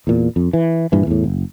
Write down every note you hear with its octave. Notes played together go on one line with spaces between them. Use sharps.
E2 A#2
F2
E3
G2 A#2 E3
E2 A2
F#1